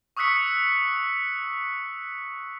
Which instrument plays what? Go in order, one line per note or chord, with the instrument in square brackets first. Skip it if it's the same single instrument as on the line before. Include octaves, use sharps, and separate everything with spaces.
[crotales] C#6 D#6 E6 F#6 B6 C#7